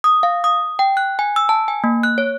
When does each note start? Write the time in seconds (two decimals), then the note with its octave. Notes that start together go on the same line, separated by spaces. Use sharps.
0.04 D#6
0.23 F5
0.44 D#6
0.79 G5
0.97 F#6
1.19 G#5
1.36 E6
1.49 A5
1.68 G#5
1.84 A#3
2.03 F#6
2.18 C#5